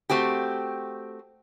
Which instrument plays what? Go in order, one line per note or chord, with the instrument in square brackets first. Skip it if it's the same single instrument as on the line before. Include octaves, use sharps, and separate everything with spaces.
[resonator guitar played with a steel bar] A3 C4 F#4 G4